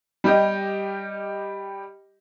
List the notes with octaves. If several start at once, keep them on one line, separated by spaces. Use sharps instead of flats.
G3 G4 D#5